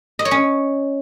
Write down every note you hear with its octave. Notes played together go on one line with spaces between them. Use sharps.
D#5
C#5
C#4